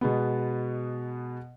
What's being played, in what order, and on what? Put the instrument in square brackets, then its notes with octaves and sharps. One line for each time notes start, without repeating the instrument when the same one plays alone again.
[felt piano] B2 G#3 B3